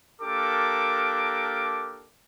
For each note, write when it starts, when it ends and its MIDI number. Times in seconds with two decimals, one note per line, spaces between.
0.22 2.09 58
0.22 2.09 62
0.22 2.09 67
0.22 2.09 69
0.22 2.09 70
0.22 2.09 86